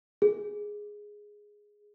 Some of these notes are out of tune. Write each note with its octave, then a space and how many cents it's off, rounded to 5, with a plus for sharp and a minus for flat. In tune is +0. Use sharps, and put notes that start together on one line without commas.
G#4 +0